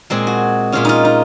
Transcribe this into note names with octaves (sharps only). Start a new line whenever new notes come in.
A#2 G#3 C4 G#4
F#4
A#2 G#3 C#4 F4
D#4 F4
D#4